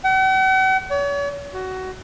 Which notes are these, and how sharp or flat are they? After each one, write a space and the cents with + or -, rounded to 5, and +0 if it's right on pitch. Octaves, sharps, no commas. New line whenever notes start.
F#5 +45
C#5 +40
F#4 +15